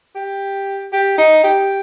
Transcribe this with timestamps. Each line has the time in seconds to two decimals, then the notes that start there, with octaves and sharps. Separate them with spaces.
0.15 G4
0.92 G4
1.18 D#4
1.44 G4